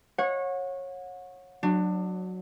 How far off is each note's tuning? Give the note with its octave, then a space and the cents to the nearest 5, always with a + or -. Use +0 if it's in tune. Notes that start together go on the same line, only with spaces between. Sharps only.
C#5 -20 F#5 -30
F#3 -5 D4 +25